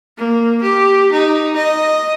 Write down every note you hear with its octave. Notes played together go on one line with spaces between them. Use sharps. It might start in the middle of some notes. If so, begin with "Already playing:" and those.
A#3
G4
D#4
D#5